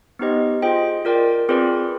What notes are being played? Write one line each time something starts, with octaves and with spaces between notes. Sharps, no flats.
B3 D#4 G4 C5 D#5
F4 G#4 C5 D#5 G5
F4 A#4 D5 G5
C4 F4 G#4 B4 D5